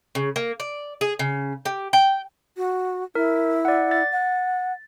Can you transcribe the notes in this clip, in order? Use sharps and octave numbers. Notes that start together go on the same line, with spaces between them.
C#3
A#3
D5
G#4
C#3
G4
G5
F#4
E4 A#4
D5 F#5
A6
F#5